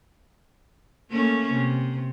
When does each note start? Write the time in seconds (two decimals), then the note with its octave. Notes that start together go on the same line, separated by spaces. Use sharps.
1.10 A3 A#3 C#4
1.53 C3